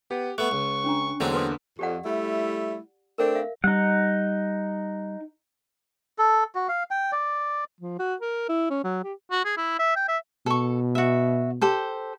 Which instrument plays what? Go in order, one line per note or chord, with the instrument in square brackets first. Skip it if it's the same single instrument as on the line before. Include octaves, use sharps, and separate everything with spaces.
[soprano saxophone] B3 [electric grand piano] G4
[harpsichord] A3 B3 [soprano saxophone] C#6 [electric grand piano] F#6
[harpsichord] C#2
[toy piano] C#4 D4 A#5
[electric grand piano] E2 D3 A#3 [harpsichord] F#3 G#3 C4
[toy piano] B4 C6 D#6
[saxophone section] F2 [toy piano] G4 D5 F#5
[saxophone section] G3 A3 E4
[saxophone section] A3 C4 D4 [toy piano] A#4
[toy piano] E5 F5
[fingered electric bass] G3 [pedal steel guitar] D#4 F#5
[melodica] A4
F#4
F5
G5
D5
[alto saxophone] F3
F#4
A#4
E4
C#4
F#3
G4
[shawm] F#4
G#4
E4
E5
G5
E5
[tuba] B2 [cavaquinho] A4 C#6
[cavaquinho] F#4 E5
G4 A4 C5